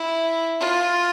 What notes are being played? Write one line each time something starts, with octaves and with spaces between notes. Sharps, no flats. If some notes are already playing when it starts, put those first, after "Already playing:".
Already playing: E4
F4